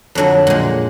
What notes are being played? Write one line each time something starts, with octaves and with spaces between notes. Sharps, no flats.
F2 D3 F#3 D4
A#2 G#3